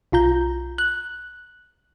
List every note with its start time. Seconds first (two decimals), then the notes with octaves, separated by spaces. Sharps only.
0.12 B1 F4 A#5 G6
0.78 F#6